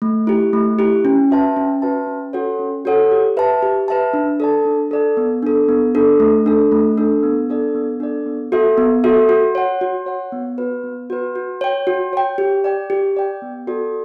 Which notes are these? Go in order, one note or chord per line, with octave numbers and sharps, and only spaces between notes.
A3
E4 G4
A3
E4 G4
C#4
F#4 B4 E5 A5
C#4
F#4 B4 E5 A5
C#4
F#4 A4 C#5 F#5
C#4
F#4 A4 C#5 F#5
G4
B4 E5 A5
G4
B4 E5 A5
D4
A4 D5 A5
D4
A4 D5 A5
B3
D4 A4
B3
D4 A4
A3
D4 A4
A3
D4 A4
B3
D4 A4 D5
B3
D4 A4 D5
B3
F#4 A4 E5
B3
F#4 A4 E5
F#4
C#5 F#5
F#4
C#5 F#5
B3
F#4 B4
B3
F#4 B4
F#4
C#5 G5
F#4
C#5 G5
G4
D5 G5
G4
D5 G5
B3
F#4 A4 D5